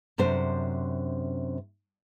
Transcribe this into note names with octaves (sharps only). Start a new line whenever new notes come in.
F#2 C3 D4 C5